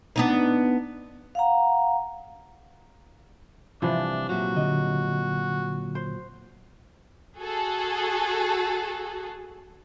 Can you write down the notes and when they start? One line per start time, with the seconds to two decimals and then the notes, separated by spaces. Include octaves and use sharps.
0.16 B3 D4 D#4
1.35 F5 F#5 A#5
3.82 C2 C3 E3 F3 D4
4.29 A#2 F#3 F#4
4.56 D3 D#5
5.95 C5
7.38 F#4 G#4 A4